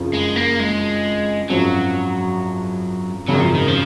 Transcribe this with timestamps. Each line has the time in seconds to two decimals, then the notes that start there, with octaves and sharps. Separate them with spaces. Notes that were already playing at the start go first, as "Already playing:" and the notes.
Already playing: F#1 F2 F3
0.14 G#3
0.36 A#3
0.60 G#3
1.50 G#1 F#2 F3 F#3
3.28 G#1 F#2 C#3 F#3
3.41 F3
3.55 D#3
3.68 F3